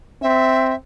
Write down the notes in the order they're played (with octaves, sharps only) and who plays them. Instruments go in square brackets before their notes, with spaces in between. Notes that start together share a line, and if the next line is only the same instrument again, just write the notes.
[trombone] C4 [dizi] E5